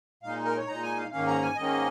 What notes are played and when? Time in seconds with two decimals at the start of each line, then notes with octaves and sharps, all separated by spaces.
0.23 A#2 G#3 D#4 F5
0.45 A#4
0.57 C#5
0.67 A#2 G#3 D#4 A#5
0.83 G#5
0.97 F5
1.11 G#2 D#3 A#3 C#4 F5
1.27 A#5
1.42 G#5
1.56 G#2 D#3 A#3 C#4 D#5